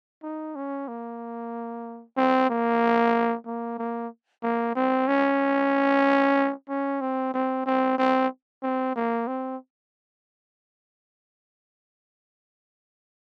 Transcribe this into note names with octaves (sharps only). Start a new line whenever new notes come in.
D#4
C#4
A#3
C4
A#3
A#3
A#3
A#3
C4
C#4
C#4
C4
C4
C4
C4
C4
A#3
C4